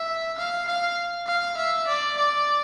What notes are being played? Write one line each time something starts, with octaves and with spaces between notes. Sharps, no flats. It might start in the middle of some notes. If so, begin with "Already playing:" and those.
Already playing: E5
F5
F5
F5
E5
D5
D5